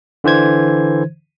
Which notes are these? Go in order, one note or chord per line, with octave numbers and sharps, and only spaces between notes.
D3 E3 C5 G#6